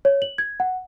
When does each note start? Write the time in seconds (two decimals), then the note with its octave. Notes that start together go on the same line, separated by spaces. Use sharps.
0.05 C#5
0.22 F#7
0.38 G#6
0.60 F#5